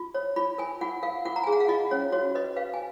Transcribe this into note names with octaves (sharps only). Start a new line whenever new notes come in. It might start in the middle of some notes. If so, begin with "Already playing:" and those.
Already playing: F4
C#5
F4 B5
A#4 G#5
F4 F#5
A#4 F5
F4 F#5
A#5
G#5
G#4
F#5
F5
F4 D#5
C#4 C#5
F#4 C#5
B4 D#5
B4 F5
G#5